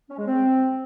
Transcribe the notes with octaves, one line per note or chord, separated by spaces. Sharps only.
C#4
G#3
C4